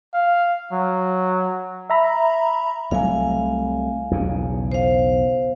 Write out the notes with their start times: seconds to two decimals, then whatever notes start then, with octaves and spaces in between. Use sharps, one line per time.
0.14 F5
0.73 F#3
1.90 E5 A#5 B5
2.91 C2 F#3 A3 F5 G#5
4.11 B1 E2 C#3
4.72 C5 F5